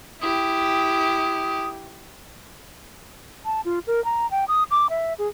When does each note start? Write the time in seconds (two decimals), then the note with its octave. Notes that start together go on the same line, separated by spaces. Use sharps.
0.21 E4 G4 D#6
3.45 A5
3.65 F4
3.87 A#4
4.05 A#5
4.31 G5
4.48 D#6
4.71 D6
4.90 E5
5.19 G#4